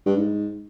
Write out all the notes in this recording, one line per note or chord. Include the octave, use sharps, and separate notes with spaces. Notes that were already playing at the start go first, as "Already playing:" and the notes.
G2
G#2